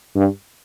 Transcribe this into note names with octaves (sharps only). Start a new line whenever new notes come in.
G2